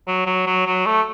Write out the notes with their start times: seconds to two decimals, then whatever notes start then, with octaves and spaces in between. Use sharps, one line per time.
0.07 F#3
0.26 F#3
0.46 F#3
0.67 F#3
0.86 A3